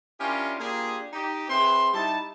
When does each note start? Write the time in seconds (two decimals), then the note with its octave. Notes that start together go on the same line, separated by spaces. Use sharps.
0.20 C#4 D4 E4 F4 G4 A#4
0.60 A#3 D4 F4 G4 G#4
1.13 D#4 G4
1.50 C4 G#4 B4 E5 C6
1.93 G3 D#4 E4 A5